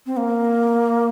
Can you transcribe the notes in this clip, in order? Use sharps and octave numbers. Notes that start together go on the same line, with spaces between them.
C4
A#3